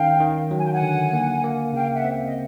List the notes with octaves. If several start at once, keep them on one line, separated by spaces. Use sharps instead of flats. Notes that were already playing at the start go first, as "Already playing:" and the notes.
Already playing: D#3 C#4 F5 G5
D#3
F#3
G#5
G5
F#5 G#5
D3
A#3
A#3
C#3 F5 G5
E5 F#5
C4
D#5